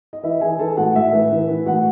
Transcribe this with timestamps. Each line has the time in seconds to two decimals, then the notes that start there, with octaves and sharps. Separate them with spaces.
0.13 D#5
0.23 E3 E4 E5
0.41 E3 G#4 G#5
0.59 E3 A4 A5
0.77 A2 F#4 F#5
0.95 A2 E4 E5
1.13 E3
1.31 E3
1.49 E3
1.66 A2 F#4 F#5